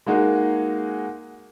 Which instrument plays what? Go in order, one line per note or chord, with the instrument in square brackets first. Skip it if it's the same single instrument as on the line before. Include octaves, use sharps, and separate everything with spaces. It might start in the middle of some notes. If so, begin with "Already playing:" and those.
[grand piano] G#3 A#3 D#4 F#4 G#4